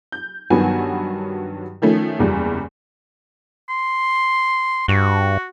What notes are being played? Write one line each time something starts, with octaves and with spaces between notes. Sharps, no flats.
G6
G2 D#3 F#3 B3 F#4 G#5
D#3 F3 A3 C#4
F#1 E2 G3
C6
G2 F#4